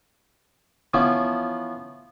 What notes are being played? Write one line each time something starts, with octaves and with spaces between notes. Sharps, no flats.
E3 F3 B3 C#4